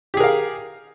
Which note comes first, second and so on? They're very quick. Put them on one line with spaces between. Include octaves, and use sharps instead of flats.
G4 G#4 A#4 F5